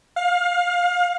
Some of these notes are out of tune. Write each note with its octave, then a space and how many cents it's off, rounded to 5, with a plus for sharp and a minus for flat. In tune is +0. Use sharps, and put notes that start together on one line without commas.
F5 +25